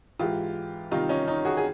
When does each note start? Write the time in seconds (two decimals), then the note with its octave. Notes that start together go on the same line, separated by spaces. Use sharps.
0.19 G#2 E3 G#3 F4 G4
0.91 C3 D#3 G3 D#4 F4
1.09 C#4 D#4
1.27 C#4 D#4
1.45 F#4 G#4
1.57 G#4